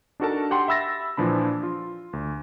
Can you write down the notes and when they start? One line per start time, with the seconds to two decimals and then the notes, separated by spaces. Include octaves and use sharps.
0.20 D4 D#4 F#4 A4 A#4 A5
0.51 G4 F#5 G5 C6
0.68 E5 B5 E6 A6 A#6
1.17 A#2 E3 F3 D4 B5
1.63 F4
2.13 D2